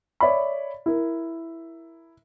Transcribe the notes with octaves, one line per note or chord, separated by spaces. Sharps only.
C#5 D5 E5 B5
E4 A#4